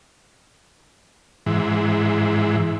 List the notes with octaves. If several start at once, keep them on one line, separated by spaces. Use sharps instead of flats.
G#2 E3